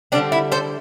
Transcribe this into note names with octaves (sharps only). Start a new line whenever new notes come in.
D3 G3 C4 D4
E4
A4 C5